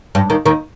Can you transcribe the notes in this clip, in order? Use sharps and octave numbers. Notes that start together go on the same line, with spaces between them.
G2
D#2 D#3
D#2 D#3